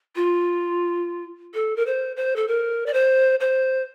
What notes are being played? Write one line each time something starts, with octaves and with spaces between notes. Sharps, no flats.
F4
A4
A#4
C5
C5
A4
A#4
D5
C5
C5